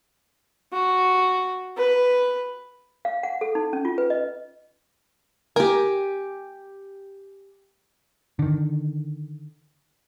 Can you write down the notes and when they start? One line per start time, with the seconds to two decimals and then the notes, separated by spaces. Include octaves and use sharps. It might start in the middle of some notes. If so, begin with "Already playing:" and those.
0.73 F#4
1.77 B4
3.05 F5
3.23 F#5
3.41 A4
3.55 D#4
3.73 C#4
3.85 F4
3.98 B4
4.10 D#5
5.56 G4 A#4 G#5
8.39 D3 D#3